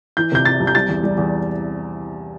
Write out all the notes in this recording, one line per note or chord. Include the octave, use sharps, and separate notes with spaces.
E3 G6
C3 G6
E3 A6
C2
G6
G3 A6
E2
G3
E2